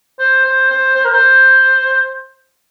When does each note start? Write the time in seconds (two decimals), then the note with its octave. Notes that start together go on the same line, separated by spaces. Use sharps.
0.19 C5
0.45 C5
0.70 C5
0.95 C5
1.05 A#4
1.13 C5